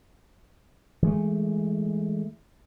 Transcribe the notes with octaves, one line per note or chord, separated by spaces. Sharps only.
E3 G#3 A3